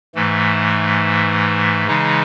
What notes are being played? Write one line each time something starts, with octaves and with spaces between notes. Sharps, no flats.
G#2 E3 A3
C#3 E3 G#3 D#4